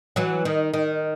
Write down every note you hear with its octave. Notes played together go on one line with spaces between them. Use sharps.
E3 F#3
D#3
D#3